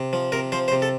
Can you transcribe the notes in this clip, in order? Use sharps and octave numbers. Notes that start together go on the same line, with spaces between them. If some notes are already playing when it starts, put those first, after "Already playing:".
Already playing: C3
F3
C3 A#4
F3 C5
C5
C3
A4